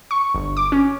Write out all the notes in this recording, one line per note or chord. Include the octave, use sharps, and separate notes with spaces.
C#6
G1
D6
C#4